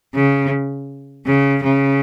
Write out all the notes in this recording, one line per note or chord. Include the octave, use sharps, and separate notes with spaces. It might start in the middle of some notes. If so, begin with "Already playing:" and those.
C#3
C#3
C#3